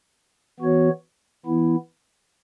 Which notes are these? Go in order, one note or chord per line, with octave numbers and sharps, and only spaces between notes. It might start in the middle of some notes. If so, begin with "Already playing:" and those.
E3 B3 F#4 C#5
E3 B3 E4